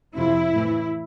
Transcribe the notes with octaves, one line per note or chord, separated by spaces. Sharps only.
F2 C3 F3 E4
A2 E3